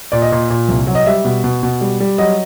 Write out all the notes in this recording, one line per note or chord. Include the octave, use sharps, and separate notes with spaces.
A#2 D5
D#5
A#2
A#2
C2
F#3
D#5
G3 E5
B2
B2
B2
G3
G3
F#3 D#5